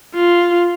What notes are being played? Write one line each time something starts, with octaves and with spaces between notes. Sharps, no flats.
F4